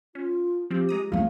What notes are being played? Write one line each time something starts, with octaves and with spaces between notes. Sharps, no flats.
C#4 F4
F3 C4 G4
G#3 A#5 D#6
C#3 E3 A3 C#4 F5